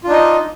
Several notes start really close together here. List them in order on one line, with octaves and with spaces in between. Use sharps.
F4 D4 D#4 D#5